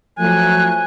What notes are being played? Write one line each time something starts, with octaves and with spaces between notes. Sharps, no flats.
F3 F#3 A3 G#5 F#6